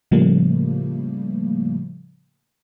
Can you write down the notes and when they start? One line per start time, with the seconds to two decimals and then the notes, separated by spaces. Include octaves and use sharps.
0.11 A2 C#3 F3 G3 A3 A#3